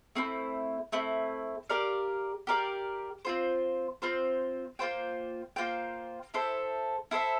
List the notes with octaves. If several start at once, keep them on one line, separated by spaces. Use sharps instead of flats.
A3 C4 E4
A3 C4 E4
G4 A#4 D5 F5
G4 A#4 D5 F5
C4 F4 C5
C4 F4 C5
A#3 F4 C5 G5
A#3 F4 C5 G5
E4 A4 C5 E5
E4 A4 C5 E5